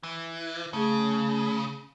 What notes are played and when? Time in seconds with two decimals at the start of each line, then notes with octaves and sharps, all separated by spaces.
0.03 E3
0.73 C#3 A3 G#4